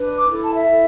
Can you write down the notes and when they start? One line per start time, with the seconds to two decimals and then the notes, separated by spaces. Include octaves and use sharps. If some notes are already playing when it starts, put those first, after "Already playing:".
Already playing: D4 B4
0.17 D6
0.30 E4 A4
0.42 A5
0.55 E5
0.67 E4 A4